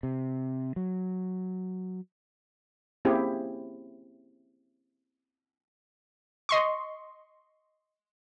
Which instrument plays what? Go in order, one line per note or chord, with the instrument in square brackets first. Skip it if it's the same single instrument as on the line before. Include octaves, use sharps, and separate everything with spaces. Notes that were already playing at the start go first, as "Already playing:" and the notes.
[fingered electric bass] C3
F#3
[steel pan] A#3 C4 C#4 E4 G4 G#4
[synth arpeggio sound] D#5 C6 C#6